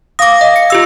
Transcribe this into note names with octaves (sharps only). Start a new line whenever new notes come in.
F5 D6 D#6 A#6
D#5
C#7
F4 G4 E6